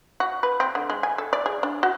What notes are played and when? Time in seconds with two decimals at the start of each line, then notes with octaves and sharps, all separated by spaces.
0.20 F#4
0.43 B4
0.60 C4
0.75 D3
0.90 G#3
1.03 G#5
1.18 A4
1.33 D5
1.46 G#4
1.63 D4
1.83 F#4